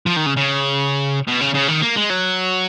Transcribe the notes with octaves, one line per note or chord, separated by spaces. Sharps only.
F3
D#3
C#3
C#3
B2
C#3
C#3
D#3
A#3
G#3
F#3